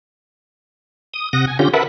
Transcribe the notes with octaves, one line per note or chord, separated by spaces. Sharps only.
D#6
C3 F#5 D#6 A#6
G#5
D3 C#4 F4 G4 G6 A#6
A#4 B4 E5 F#5 A5 B5